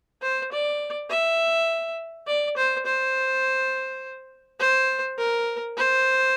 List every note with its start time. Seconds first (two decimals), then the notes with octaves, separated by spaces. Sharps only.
0.22 C5
0.52 D5
1.10 E5
2.28 D5
2.57 C5
2.86 C5
4.60 C5
5.18 A#4
5.77 C5